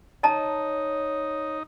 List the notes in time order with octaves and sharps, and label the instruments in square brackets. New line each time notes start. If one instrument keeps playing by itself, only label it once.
[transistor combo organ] D#4 [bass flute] C#5 [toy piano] D#5 A5 A#5